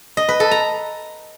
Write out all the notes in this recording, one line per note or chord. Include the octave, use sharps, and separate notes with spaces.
D#5
B4
A4
A#5